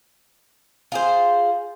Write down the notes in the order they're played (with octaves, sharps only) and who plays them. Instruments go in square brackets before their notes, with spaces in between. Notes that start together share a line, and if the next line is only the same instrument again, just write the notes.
[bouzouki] F4 G#4 C5